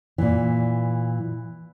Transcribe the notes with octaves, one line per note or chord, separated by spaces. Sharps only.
A#2 E3